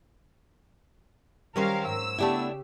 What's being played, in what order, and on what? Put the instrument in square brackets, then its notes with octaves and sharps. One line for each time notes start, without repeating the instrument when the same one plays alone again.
[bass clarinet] D#3 [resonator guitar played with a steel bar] F#3 C#4 C5 [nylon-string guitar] G3 [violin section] A#4 F5
[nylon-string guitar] G#2 [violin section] E6
[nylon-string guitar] C#3 G4 [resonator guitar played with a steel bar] A3 D4 E4 [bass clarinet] B3